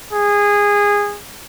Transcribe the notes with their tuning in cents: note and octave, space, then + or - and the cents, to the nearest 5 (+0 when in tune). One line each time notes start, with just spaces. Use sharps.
G#4 -20